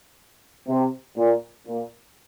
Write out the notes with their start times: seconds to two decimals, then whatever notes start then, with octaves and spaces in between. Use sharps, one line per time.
0.69 C3
1.17 A#2
1.67 A#2